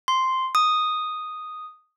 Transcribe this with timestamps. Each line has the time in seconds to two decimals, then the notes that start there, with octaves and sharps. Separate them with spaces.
0.08 C6
0.55 D#6